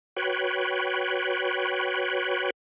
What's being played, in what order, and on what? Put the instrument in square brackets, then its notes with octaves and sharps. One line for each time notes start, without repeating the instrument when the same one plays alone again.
[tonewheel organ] F#4 B4 C#5 G5 B5